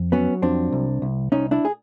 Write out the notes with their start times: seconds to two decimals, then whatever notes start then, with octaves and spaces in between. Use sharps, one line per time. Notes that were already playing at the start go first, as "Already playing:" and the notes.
Already playing: F2
0.12 F#3 B3 C#4
0.42 F2 C4 D4
0.72 C2
1.02 C2
1.32 C2 C#4 D#4
1.51 D4 E4
1.65 G#4